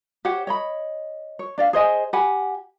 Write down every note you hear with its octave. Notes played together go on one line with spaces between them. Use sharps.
G4 C5 C#5 F#5
C#5 D#5 B5
C#5
D4 D5 F5
G#4 C5 D#5 G#5
G4 F#5 G#5 B5